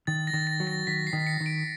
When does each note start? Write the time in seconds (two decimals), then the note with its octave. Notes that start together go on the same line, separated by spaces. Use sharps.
0.07 D#3 A6
0.27 A#6
0.34 D#3
0.47 A#6
0.60 F#3
0.67 A#6
0.87 D#3 B6
1.07 C7
1.13 D#3
1.27 C#7
1.40 D#3
1.46 D7